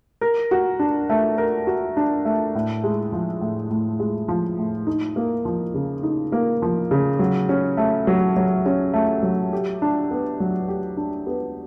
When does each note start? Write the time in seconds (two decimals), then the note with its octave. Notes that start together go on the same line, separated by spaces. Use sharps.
0.21 A#4
0.51 F#4
0.79 D4
1.10 A3
1.38 A#4
1.67 F#4
1.97 D4
2.25 A3
2.55 A2
2.84 G#3
3.12 F3
3.41 A2
3.71 A2
4.00 G#3
4.28 F3
4.58 A2
4.87 D#4
5.16 A#3
5.45 F3
5.74 C#3
6.03 D#4
6.32 A#3
6.62 F3
6.91 C#3
7.19 F#3
7.49 C#4
7.77 A3
8.07 F#3
8.37 F#3
8.66 C#4
8.94 A3
9.23 F#3
9.53 G4
9.82 D4
10.11 B3
10.40 F#3
10.68 G4
10.97 D4
11.27 B3